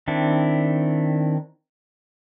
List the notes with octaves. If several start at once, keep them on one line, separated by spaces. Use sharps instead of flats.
D#3 C4 D4 E4